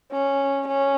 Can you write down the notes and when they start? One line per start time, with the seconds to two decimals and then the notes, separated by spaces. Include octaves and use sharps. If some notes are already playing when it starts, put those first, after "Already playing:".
0.12 C#4
0.68 C#4